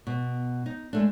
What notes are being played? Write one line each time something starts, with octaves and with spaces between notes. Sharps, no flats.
B2
D#4
G#3 A3 D4